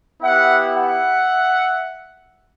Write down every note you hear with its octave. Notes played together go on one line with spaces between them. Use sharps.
B3 E4 G4 E5 F#5
E5 F#5